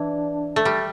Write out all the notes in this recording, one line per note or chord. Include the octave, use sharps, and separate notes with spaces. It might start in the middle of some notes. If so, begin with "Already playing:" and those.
Already playing: E3 D4
A3
G3